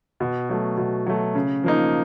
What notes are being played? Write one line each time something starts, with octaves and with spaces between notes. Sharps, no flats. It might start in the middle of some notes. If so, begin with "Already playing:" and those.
B2
F#3 A3
B2
F#3 A3
C#3
F3 A#3 D#4